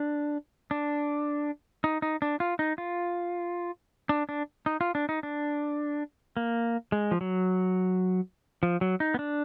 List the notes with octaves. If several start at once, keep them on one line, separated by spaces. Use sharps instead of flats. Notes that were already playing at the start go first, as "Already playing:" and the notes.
Already playing: D4
D4
D#4
D#4
D4
F4
D#4
F4
D4
D4
D#4
F4
D4
D#4
D4
A#3
G#3
F3
F#3
F3
F#3
D#4
B3
D4